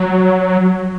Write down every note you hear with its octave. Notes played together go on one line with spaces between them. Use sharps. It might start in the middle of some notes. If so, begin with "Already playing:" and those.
Already playing: F#3